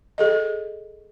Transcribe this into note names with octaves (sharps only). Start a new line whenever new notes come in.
G#4 A4 D#5